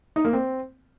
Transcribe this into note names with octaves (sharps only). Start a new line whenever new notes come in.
D#4
A#3
C4